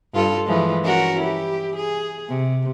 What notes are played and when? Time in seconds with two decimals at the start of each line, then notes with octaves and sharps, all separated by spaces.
0.14 G2 F4 A4
0.46 E3 F3 G#3
0.84 C#4 F#4 A#4
1.19 E4 G4
1.76 G#4
2.29 C3